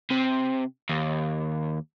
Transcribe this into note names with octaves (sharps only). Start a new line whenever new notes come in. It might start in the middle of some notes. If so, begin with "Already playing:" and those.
C3
D#2